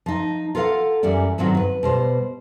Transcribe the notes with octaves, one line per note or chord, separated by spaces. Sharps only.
F3 D#4
F4 A4 A#4 C5 F5 F#5
F#2 E3 G3 C#4 D5
G2 A#2 D#3 F#3 C4 F4
B4
B2 G3 C5